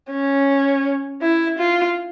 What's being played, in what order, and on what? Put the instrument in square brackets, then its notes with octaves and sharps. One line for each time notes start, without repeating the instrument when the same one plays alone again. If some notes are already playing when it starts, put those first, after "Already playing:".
[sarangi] C#4
E4
F4